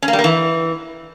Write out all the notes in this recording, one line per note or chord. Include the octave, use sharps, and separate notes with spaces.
C#4
A#3
G3
A#3
E3